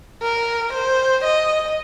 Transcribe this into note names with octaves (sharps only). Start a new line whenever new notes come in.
A#4
C5
D#5